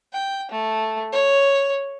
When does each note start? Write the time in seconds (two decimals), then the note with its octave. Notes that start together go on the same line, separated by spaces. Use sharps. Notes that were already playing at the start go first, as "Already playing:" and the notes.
0.13 G5
0.51 A3
1.12 C#5